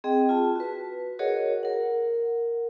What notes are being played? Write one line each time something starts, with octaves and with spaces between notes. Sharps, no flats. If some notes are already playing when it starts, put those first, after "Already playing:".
C4 G#4 D#5 G5
F4 A5
F#4 B4
F#4 G#4 A#4 C#5 D#5 F#5
A#4 F#5